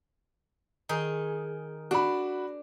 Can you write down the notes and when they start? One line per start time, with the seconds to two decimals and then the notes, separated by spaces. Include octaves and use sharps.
0.89 D#3 D#4 G#4
1.91 D4 F#4 B5